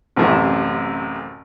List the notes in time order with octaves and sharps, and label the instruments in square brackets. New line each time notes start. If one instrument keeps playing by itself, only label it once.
[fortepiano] A1 F#2 C3 E3 A3